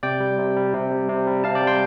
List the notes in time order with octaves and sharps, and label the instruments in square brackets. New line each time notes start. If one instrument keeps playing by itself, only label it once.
[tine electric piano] C3 D5 G5
G3
C3
G3
C3
G3
C3
G3
C3 F5 A5
D5 G5
G3
G5 C6